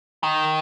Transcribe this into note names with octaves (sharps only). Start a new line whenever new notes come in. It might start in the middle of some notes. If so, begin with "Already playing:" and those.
D#3